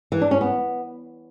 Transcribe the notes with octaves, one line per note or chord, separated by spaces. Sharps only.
E3
D4
C#4
B3